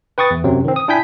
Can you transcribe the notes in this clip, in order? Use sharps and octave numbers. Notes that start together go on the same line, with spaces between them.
B4 G5 C#6 D#6 A6
E2
F#2 C3 F#3 C4
D#3 C4
D#6
D4 E4 G5 G#5 G6 B6